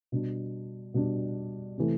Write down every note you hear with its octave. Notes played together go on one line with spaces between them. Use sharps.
B2 G3 D4
B2 G3 D4
C3 E3 A3